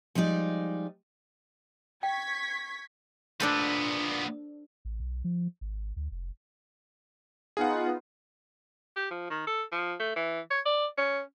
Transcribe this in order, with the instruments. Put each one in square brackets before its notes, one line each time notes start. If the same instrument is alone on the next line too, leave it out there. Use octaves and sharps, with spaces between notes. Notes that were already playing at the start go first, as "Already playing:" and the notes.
[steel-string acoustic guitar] F3 G3 G#3 D#4 D5
[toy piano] G5 [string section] C#6 G#6 B6
[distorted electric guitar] A#2 B3 [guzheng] D4 A4 C5
[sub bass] A1
B1
F3
G#1
D2
F1
[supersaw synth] B3 D#4 F4 [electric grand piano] G#4 F#5
[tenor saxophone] G4
F3
D#3
A4
F3
A3
E3
C#5
D5
C#4